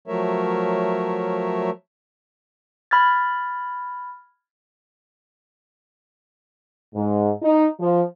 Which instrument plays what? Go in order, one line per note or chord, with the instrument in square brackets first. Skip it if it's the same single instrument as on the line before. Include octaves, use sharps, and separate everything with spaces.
[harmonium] F3 F#3 A3 A#4 C#5 E5
[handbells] B5 F6 G#6 A6
[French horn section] G#2
D#4
F3